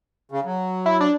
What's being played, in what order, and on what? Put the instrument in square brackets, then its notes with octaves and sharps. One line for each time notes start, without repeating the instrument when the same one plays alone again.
[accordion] C#3
F#3
[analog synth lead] E4
D4